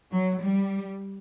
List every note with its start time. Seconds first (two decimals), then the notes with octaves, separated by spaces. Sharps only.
0.11 F#3
0.40 G3